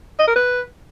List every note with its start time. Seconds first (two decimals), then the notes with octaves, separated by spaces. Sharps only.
0.19 D#5
0.27 A#4
0.36 B4